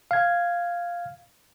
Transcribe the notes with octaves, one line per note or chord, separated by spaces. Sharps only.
F5 G#6